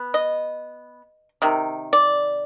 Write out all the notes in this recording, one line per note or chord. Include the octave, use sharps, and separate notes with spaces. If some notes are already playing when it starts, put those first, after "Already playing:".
Already playing: B3
D#5
C3 D#3
D5